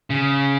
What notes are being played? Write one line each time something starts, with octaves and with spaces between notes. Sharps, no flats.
C#3